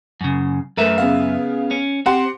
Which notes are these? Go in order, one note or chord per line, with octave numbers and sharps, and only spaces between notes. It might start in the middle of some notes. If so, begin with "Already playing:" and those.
F#2 C#3
F#2 A3 A#4 B4 E5
C#3 B3 F5
C#4
C4 G4 F#5 C6